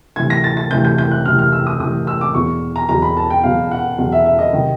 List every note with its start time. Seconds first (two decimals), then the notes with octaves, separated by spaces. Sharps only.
0.16 D2 C3 E3 G#6
0.30 A#6
0.44 A6
0.57 A6
0.71 D2 C3 E3 G6
0.84 G6
0.98 G6
1.11 F#6
1.25 D2 C3 E3 F6
1.39 F6
1.52 E6
1.67 D#6
1.80 D2 C3 E3 D#6
2.07 E6
2.21 D6
2.34 E2 B2 C#6
2.76 A#5
2.89 E2 B2 A#5
3.02 B5
3.17 A5
3.30 G5
3.43 E2 B2 F5
3.71 F#5
3.98 E2 B2 F#5
4.12 E5
4.26 E5
4.39 D#5
4.53 C3 D#3